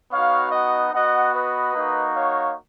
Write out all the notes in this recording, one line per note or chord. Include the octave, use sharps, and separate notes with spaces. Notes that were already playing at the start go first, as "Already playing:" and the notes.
B3 D#4 F#4 C#5 F5
D#5 F#5
B3 F#4 D#5 F#5
B4 D#5
A#3 D#4 F#4
C#5 F5